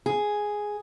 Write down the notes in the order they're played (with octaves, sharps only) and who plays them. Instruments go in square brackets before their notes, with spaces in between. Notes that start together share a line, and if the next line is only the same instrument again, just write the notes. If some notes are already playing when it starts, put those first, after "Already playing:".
[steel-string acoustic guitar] G#4